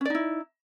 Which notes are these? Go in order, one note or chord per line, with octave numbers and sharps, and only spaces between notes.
C#4 D#4 E4 D5